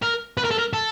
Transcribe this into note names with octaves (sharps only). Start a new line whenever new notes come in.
A#4
B4
A#4
A4
A#4
A4